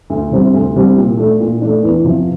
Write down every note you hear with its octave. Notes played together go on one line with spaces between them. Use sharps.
D2
C3 G3 C4
D2
C3 G3 C4
A#2
A3 D4
A#2
A3 D4
E2
C3 F3